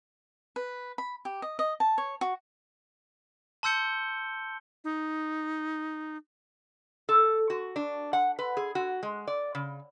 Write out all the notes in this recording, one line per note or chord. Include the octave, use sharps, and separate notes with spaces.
B4
B5
G4
D#5
D#5
A5
C#5
F#4
A5 C6 E6 G6 C#7 G7
D#4
A4
F#4
D4
F#5
B4
G#4
F#4
G#3
D5
C#3